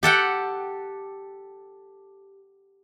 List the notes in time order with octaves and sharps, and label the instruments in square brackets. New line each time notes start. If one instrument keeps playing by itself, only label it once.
[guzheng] G4 A4 F#5 G5